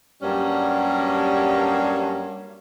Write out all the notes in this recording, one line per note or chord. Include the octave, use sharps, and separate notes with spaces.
G2 F#3 G3 A#3 C#4